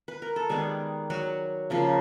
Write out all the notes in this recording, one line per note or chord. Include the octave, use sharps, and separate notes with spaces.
B4
A#4
A4
D#3 G3 G#3 B3 G#4
F#3 F#4
C#3 F3 A#3